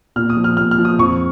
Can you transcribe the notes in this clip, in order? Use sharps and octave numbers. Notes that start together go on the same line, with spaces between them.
A#2 F6
D#6
F3
F6
A#2 F6
F6
F3
D#6
F2 C#6